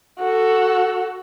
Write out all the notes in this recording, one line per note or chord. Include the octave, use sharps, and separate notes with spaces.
F#4 A4